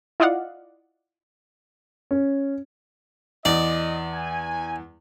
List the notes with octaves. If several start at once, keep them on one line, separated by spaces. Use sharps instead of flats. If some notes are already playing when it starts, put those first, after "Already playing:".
E4 F4 D5 D#5 F5 F#5
C#4
E2 D5 D#5
G#5